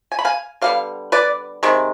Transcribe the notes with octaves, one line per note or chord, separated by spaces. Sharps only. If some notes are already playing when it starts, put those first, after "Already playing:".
G#5
B5
F5 G#5
D3 G3 B3 F5
B4 D5
C3 D#3 G#3